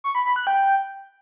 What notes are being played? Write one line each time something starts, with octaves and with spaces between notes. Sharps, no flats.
C#6
B5
B5
F#6
G5